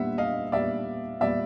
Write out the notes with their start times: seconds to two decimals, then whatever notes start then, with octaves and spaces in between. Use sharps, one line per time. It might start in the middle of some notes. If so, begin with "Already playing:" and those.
Already playing: A#2 G3 B3 E5 F#5
0.18 D#5 F5
0.52 A#2 G3 B3 D5 E5
1.20 A#2 G3 B3 D5 E5